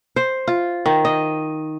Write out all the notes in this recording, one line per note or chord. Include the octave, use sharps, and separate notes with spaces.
C5
F4
D#3
D#5